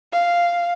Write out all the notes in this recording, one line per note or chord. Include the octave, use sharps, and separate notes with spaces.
F5